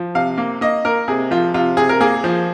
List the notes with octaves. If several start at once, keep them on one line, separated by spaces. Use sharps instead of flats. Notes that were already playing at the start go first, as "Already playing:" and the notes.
Already playing: F3
C3 F5
A#3
A#3 D#5
A#3 A#4
C3 G#4
F3 F4
C3 F4
C3 G#4
A#4
A#3 G#4
F3